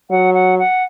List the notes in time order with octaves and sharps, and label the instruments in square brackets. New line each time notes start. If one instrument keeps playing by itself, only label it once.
[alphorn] F#3 [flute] F#5
[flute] F#5
F#5